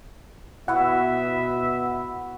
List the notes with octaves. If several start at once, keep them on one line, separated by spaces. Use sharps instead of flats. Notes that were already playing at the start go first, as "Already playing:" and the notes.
B2 B3 E4 F#4 E5 F#5